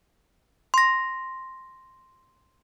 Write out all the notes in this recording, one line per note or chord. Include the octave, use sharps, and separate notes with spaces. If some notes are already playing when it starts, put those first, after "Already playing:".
C6 A#6